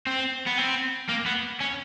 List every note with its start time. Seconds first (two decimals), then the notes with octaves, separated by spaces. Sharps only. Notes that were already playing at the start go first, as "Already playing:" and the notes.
0.06 C4
0.46 B3
0.58 C4
1.09 A#3
1.26 B3
1.60 C#4